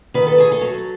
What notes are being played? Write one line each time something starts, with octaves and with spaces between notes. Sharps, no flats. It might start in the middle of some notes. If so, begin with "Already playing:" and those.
D#3 B4
A4
A3 G#4
A4
F#3